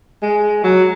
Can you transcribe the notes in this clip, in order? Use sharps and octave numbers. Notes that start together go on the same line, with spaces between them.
G#3
F#3